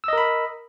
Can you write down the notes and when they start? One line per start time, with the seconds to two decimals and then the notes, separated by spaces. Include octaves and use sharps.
0.04 E6
0.08 D#5
0.13 A#4
0.17 B5